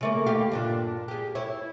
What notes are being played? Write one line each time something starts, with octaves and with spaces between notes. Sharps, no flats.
C#3 A3 A#3
D#2 G4 F5
G2 A#2 D4
G4 G#4
E4 C#5